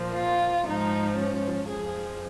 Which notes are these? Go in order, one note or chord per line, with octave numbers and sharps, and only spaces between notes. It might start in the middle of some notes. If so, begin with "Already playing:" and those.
Already playing: A#2 F3
F4
G#2 F3 D#4
C#4
F2 F3 G#4